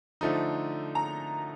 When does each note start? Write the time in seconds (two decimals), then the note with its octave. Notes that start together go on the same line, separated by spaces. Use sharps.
0.21 D3 F3 A3 D#4
0.95 A#5